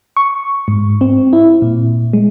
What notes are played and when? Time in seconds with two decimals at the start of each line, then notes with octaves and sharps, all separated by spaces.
0.17 C#6
0.68 G#2
1.01 C4
1.33 E4
1.62 A#2
2.13 G#3